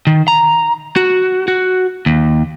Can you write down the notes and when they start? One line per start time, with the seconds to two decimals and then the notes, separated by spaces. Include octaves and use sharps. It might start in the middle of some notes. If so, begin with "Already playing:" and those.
0.07 D#3
0.28 A#5
0.96 F#4
1.48 F#4
2.06 D#2